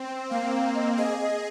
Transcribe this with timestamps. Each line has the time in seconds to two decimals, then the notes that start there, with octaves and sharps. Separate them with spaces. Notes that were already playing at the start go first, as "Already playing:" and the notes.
Already playing: C4
0.31 A#3 F5
0.54 F5
0.75 D#5
0.97 G#4 D#5
1.21 D#5